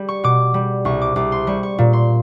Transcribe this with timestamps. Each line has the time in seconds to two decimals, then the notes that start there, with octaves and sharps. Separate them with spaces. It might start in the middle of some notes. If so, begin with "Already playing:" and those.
Already playing: G3
0.09 C#6
0.24 B2 D6
0.54 G3
0.85 C2 C#6
1.02 D6
1.16 C2 D6
1.32 C6
1.47 G3 C#6
1.63 C#6
1.78 A#2
1.93 C6